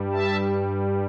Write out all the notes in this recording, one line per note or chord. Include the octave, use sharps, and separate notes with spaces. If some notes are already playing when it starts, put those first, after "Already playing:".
Already playing: G2 G3
E5 A5